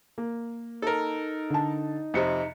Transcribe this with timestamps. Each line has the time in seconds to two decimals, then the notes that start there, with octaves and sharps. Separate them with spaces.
0.18 A#3
0.82 D#4 A4 A#4
1.50 D3 A5
2.14 F2 C3 D#5 C#7